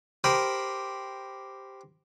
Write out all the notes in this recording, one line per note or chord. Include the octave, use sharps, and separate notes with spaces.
G4 A#4 C5 B5 D#6